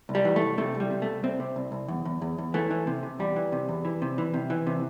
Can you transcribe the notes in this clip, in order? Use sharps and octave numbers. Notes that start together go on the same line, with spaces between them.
C2
G3
E3
A3
C2
C3 A3
C2
G3
C3
C2 A3
C2 C4
C3
C2
C2
E2
E2
E2
E2
E3 A3
E3
C3
C3
E2 G3
E3
C3
E2
E3
C3
E3
C3
E3
C3